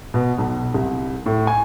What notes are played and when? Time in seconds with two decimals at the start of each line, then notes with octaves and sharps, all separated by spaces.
0.14 B2
0.38 B1
0.74 C2
1.26 A2
1.47 G#5